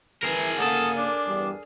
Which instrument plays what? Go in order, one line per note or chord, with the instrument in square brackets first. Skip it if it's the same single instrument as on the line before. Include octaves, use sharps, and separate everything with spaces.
[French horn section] E3 [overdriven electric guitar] G#4 A#4
[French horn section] C#3 A#3 [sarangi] A4 [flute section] F#5 D#6
[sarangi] D4 [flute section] D6
[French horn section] E2 G2 G3